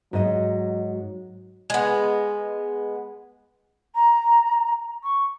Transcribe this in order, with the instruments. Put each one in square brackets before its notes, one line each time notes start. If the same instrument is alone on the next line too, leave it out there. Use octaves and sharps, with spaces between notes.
[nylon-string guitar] G#2 D#5 [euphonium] F#3
[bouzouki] G#3 B3
[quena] A#5
C#6